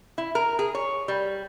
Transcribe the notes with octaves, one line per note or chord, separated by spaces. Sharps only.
E4
A#4
G#4
C#5
G3